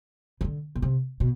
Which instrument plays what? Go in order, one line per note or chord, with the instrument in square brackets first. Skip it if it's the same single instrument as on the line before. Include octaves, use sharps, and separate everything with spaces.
[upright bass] C#3
D3
B2
C3
B2